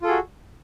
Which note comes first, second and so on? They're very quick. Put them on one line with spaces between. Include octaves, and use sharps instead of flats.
F4 A4 G#4 F#4